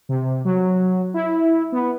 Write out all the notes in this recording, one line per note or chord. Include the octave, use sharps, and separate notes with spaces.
C3
F#3
E4
B3